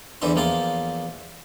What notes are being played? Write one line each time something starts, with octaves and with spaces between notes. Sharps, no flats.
E2 D3 E3 C5 E5 C6
E2 F3 A#3 F4 G5 C6